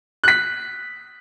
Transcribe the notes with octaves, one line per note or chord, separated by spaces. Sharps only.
F#6 B6